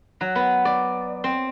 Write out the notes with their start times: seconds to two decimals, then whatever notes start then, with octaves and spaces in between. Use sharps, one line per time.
0.21 F#3
0.35 B3
0.65 D5
1.24 C4